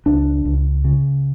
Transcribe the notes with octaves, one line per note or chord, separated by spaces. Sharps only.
C#2 D4
C#2
C#3